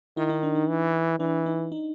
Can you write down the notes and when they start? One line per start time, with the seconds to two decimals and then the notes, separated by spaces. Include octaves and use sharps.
0.17 D#3 E4
0.30 D#4
0.43 D4
0.55 D#4
0.69 E3
1.20 E3 D4
1.46 D#4
1.72 D#4